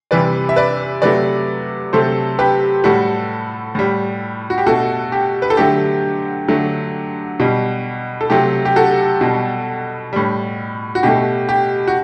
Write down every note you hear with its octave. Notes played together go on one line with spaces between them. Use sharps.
C3 E3 G3 B4 D5
E5
B4 D5
C3 F#3 A3 B4 D5
C3 F#3 A3 A4 C5
G4 B4
A2 G3 F#4 A4
A2 G3
F#4
G4
B2 A3 F#4 A4
G4
B4
A4
D3 F#3 A3 G4
D3 F#3 A3
B2 G3
A4
C3 F#3 A3 G4
G4
F#4 A4
B2 G3
A2 G3
F#4
B2 A3 G4
G4
F#4